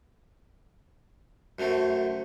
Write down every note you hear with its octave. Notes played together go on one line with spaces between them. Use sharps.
F#2 F#3 A3 C4